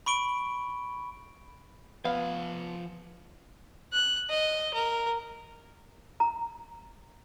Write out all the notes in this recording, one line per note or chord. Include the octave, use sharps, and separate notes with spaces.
B5 C#6 D7 G7
F3 B3 F5 G#5
F#6
D#5
A#4
A#5